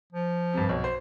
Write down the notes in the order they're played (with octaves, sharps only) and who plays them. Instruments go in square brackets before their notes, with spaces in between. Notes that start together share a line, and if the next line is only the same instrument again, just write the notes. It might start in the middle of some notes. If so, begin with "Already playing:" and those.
[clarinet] F3
[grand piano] G2 C3
B1
C5